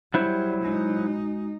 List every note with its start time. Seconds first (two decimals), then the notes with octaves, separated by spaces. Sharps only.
0.14 F#3 G3 E4 C5
0.65 G#3 D#4 F#4